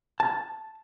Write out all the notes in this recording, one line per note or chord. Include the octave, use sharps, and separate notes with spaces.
A5